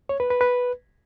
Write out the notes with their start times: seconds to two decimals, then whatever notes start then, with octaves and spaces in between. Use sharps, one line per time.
0.09 C#5
0.20 B4
0.30 B4
0.41 B4